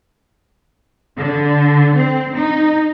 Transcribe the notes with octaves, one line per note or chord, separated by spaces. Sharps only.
D3
C4
D#4